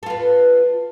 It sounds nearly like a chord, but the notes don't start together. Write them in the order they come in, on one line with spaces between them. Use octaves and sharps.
A4 F4 B4